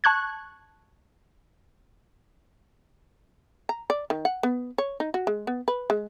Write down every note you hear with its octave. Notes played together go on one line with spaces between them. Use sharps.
A5 C#6 F#6 G#6
A#5
D5
D#3
F#5
B3
C#5
D#4
F#4
G#3
B3
B4
G#3